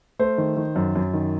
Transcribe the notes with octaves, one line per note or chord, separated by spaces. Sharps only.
A3 C5
D#3
D#3
F#2
F#2
D#3